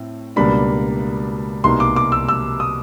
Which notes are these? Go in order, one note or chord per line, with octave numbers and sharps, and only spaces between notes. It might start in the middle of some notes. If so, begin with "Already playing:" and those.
Already playing: A2 C4
C#2 B2 G3 A#3 D4 B5
C2 B2 G3 A#3 D#4 C6
D6
D6
E6
E6
D#6